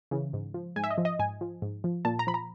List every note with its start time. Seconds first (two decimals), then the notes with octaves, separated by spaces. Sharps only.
0.11 C#3 E3
0.33 G#2
0.54 F3
0.76 G#2 G#5
0.84 E5
0.91 D#5
0.98 F3
1.05 D#5
1.19 G#2 G#5
1.41 F3
1.62 G#2
1.84 F3
2.05 A#2 A5
2.19 A#5
2.27 F3 B5
2.34 A#5